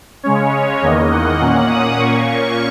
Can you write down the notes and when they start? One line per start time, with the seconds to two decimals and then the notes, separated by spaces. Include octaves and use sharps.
0.23 C#3 G#3 C#4 C#5
0.82 E2 D#3 A#3 D#5
1.11 F#5
1.41 A#2 A#3 C#4
1.70 D#6
1.99 A#2 A#3 C#4 C#6